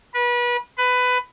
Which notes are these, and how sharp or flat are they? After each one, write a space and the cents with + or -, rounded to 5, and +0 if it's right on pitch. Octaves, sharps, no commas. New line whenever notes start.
B4 -30
B4 +15